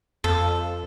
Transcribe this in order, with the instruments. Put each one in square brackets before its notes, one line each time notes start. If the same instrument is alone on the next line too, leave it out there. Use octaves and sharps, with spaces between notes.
[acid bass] F2 [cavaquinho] A4